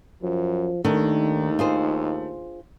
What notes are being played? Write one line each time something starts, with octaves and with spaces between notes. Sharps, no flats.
F#2 F3
D#2 D#3 A3 D4 D#4
F4 G#4 C5